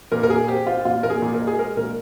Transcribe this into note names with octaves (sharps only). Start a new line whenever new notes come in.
A#2 A#4
A#4
A#2 G#4
C4 G4
C4 F4
A#2 F4
A#2 A#4
G#4
A#2
A#4
G#3
G#4
G#3 A#4
A#2 A#4